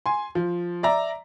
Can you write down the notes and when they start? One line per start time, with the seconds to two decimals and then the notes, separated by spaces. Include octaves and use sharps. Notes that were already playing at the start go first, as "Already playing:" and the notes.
0.06 G#5 C6
0.35 F3
0.83 D5 E5 A#5